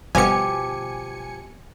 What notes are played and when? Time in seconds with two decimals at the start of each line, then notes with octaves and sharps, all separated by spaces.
0.15 G1 B2 F3 G4 G#5 C#7